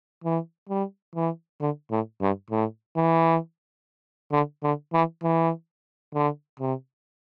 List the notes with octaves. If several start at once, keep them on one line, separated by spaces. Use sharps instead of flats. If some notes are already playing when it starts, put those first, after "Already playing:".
E3
G3
E3
D3
A2
G2
A2
E3
D3
D3
E3
E3
D3
C3